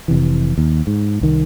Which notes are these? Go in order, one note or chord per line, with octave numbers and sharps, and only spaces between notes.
F1 C3 E3
D#2
G#2
C2 D#3